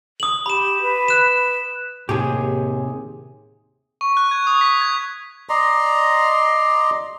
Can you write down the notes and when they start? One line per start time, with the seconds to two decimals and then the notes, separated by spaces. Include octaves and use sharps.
0.20 D#6 F#7
0.46 G4 B5 E7
0.82 B4
1.08 F#6 E7
2.09 D#2 A2 C3 G4 G#4
4.01 C#6
4.17 F#6
4.31 G#6
4.47 D#6
4.61 B6
4.81 G#6
5.49 D5 D#5 A#5 C6